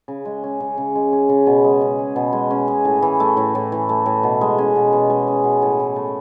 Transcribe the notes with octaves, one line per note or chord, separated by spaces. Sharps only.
C#3
G#3
C#4
C#3
C#3
G#3
C#4
C#3
B2
G#3
C#4
G#4
B2
G#3
C#4
G#4
A2
E3
A3
A2
A2
E3
A3
A2
B2
G#3
C#4
B2
B2
G#3
C#4
B2
A2
E3
A3